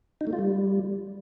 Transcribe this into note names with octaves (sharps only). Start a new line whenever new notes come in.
D#4
A3
F4
G3